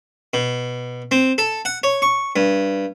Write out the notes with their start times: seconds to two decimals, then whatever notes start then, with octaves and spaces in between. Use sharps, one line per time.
0.34 B2
1.11 C4
1.38 A4
1.65 F#5
1.83 C#5
2.02 C#6
2.36 G2